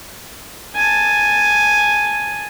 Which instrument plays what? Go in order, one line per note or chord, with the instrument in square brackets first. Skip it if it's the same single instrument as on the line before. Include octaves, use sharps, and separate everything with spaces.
[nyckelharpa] G#5 A5